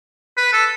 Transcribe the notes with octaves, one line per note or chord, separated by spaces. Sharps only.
B4
A4